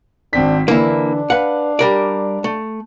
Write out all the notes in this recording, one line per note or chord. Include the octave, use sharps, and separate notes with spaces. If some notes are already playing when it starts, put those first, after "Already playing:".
G#1 C4 D4 B6
D3 E3 A#3 D4 E4
B4 F5 F#5
G3 A#4 D5
A3